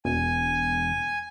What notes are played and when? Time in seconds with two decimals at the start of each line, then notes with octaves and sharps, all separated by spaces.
0.05 E1 G#5